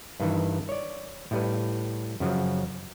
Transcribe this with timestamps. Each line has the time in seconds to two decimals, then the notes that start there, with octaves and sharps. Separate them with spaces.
0.20 G2 D#3 E3
0.69 C#5 D5
1.31 A2 G3 B4
2.20 F#2 C#3 F3 F#3